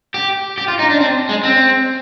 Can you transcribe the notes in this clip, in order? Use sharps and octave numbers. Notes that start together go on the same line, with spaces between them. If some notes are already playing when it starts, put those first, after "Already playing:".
G4
G4
F4
D#4
D4
C4
G#3
C4